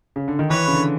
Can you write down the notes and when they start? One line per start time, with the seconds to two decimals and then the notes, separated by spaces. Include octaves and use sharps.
0.16 C#3
0.28 D3
0.39 D#3
0.50 E3 B4 C#5
0.68 C#3
0.73 D3